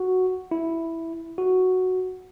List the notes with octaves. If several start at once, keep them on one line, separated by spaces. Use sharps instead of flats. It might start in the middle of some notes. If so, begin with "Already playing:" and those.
Already playing: F#4
E4
F#4